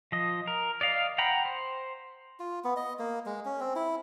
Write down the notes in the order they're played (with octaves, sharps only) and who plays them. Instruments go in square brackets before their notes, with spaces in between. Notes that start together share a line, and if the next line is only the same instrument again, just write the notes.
[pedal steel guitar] F3 D#5
A#4
D5 D#5 F5
F#5 G5 A#5 B5
C5
[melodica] F4
B3
D#5
A#3
G#3
C#4
C4
E4